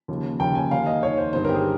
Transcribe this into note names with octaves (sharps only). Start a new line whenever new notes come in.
D#2 C#3 F3
D#2 C#3 F3 G5
G#5
D#2 D#3 F5
D#5
D#2 D#3 C#5
C5
G1 G2 D#3 C5
A#4
G4
G#4